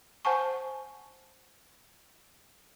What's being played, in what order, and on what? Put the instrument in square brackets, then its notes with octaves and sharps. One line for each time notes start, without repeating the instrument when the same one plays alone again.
[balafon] C5 F#5 G#5 A5 C#6